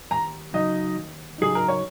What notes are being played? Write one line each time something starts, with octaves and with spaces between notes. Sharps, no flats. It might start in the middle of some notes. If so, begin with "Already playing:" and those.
D#2 A#5
C#3 F#3 D#4 D#5
D#2
C#3 F#3 D#4 G#4
A#4
C#5